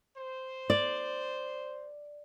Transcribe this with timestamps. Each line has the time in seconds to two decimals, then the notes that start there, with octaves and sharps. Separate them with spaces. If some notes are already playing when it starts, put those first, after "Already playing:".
0.16 C5
0.70 D5